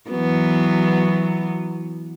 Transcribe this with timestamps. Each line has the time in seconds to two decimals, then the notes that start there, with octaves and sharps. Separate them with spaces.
0.10 E3 F#3 B3